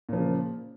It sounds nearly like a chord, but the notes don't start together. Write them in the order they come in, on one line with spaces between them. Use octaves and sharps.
A#2 F3 C#3